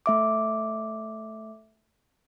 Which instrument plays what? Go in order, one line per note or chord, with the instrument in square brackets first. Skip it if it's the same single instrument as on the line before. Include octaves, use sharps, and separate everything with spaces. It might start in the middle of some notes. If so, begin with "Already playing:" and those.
[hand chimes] A3 E5 D6